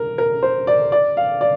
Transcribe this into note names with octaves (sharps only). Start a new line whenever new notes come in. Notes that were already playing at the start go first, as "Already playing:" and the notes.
Already playing: A#4
A#4
C5
D5
D5
F5
D5